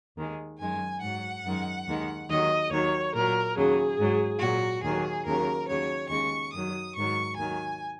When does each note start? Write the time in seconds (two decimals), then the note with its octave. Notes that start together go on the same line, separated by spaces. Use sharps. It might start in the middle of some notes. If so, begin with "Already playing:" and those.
0.17 D#2 D#3 G#3
0.59 F#2 D#3 G#3 G#5
1.02 G#2 F#3 F#5
1.45 F#2 D#3 G#3
1.87 D#2 D#3 G#3
2.29 D#2 D#3 F#3 D#5
2.71 D#2 D#3 F#3 C#5
3.14 A#2 F#3 A#4
3.56 D#2 C#3 F#3 G#4
3.98 G#2 F#3
4.41 A#2 F#3 F#4
4.84 D#2 D#3 F#3 G#4
5.26 D#2 C#3 F#3 A#4
5.68 D#2 C#3 F#3 C#5
6.10 D#2 C#3 G#3 C#6
6.53 F#2 D#3 F#3 D#6
6.96 G#2 D#3 F#3 C#6
7.38 D#2 D#3 F#3 G#5